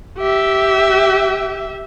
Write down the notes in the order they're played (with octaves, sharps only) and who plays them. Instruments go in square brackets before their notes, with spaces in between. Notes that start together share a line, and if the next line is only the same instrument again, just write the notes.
[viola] G4 E5